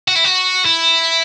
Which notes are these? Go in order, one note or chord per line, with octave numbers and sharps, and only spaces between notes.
F#4
E4
F#4
E4